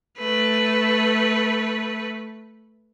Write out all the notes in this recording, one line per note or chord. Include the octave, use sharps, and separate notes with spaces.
A3 B4